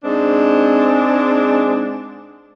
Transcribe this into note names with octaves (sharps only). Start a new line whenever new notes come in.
G#2 G#3 C4 D4